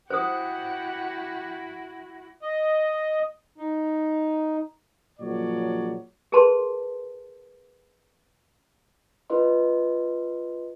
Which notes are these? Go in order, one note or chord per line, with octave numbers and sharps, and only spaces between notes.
E4 F#4 G4 C5 F#5 D#6
D#5
D#4
A#2 C#3 F3 F#3 C#5 D5
G#4 A#4 B4 A5 C6
F4 B4 D#5 C6